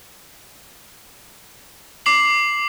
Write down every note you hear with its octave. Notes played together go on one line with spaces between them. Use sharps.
D6 C7 F#7